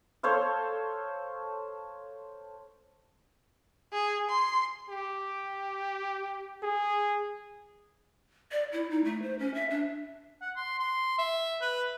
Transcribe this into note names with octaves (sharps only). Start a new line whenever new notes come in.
A4 C5 C#5 F5
G#4
C6
G4
G#4
D5
E4
D#4
A3
C5
C#4
E5
D4
F#5
C6
C6
E5
B4